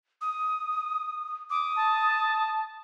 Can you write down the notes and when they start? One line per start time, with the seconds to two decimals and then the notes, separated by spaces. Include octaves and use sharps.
0.21 D#6
1.50 D6 D#6
1.76 A5